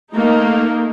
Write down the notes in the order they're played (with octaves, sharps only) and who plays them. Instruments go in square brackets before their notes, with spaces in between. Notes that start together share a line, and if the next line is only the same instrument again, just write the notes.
[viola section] A3 A#3 D#4